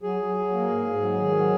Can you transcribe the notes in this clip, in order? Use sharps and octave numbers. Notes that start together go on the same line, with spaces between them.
F#3 G#4
F#3
F#3
A#3
G#2
G#2
F#3
D#3
F#3